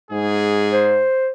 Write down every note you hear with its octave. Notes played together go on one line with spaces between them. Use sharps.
G#2 G#4
C5